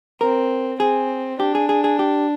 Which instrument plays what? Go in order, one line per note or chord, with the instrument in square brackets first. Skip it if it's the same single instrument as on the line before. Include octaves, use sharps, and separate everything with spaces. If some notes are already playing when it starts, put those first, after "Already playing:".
[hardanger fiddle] C4 [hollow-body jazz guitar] A#4
[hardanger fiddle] C4 [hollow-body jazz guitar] G#4
[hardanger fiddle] D4 [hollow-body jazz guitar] G4
[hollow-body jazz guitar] G#4
G#4
G#4
G4